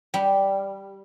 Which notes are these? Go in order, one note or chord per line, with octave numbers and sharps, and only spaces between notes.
G3